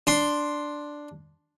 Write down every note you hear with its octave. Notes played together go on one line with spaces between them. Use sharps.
D4 C6